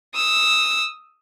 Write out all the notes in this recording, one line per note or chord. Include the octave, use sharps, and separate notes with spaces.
D#6 E6